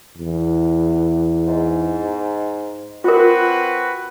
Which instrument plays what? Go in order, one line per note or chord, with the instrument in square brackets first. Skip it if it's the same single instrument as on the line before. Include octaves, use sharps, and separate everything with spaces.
[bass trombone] E2
[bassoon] G#2
[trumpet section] C4 F#4 B4 [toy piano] F4 A#4